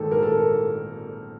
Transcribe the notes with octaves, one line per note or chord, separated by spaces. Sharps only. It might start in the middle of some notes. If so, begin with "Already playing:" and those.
Already playing: A#1 G#2 D#3 A4
A#4
A4